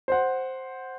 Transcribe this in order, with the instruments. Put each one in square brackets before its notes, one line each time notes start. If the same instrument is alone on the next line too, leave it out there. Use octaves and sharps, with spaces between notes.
[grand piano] C5 F#5